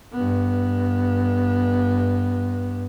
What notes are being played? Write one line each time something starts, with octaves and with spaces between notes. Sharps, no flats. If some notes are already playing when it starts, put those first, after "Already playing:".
G2 B3